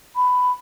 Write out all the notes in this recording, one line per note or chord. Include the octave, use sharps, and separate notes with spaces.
B5